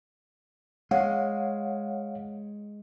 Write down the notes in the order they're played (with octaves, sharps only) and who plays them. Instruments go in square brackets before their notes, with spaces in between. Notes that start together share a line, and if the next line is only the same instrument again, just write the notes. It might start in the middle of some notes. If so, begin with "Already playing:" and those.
[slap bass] G#3 [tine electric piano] C#5 F5 F#5